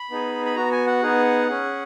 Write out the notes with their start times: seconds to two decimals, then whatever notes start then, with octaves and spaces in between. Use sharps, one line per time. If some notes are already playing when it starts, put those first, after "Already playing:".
Already playing: B5
0.10 B3 D#4 G#4
0.46 B5
0.56 B3 F#4 A#5
0.72 G#5
0.87 F#5
1.03 B3 D#4 G#4
1.48 C#4 G#4